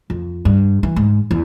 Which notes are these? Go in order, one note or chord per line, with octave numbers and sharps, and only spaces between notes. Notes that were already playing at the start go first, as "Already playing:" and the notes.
F2
G2
E3
G#2
E2